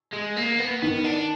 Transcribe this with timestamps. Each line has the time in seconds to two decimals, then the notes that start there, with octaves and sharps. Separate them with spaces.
0.13 G#3
0.36 A#3
0.59 B3
0.82 D#3 B3
1.04 D4